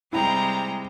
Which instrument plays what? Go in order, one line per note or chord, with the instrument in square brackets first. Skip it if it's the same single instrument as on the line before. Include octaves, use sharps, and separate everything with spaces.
[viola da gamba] C3 G3 G#3 [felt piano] E4 [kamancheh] G5 A#5